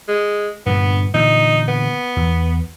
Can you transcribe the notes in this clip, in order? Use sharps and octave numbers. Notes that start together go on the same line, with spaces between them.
G#3
G2 A#2 D3 B3
A#2 D3 E3 D#4
B3
E2